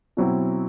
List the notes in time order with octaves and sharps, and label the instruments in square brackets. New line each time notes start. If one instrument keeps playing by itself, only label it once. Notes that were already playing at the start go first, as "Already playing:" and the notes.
[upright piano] B2 F#3 C4 E4